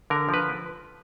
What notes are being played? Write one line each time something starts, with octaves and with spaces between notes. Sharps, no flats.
D3 A#4
F3
B4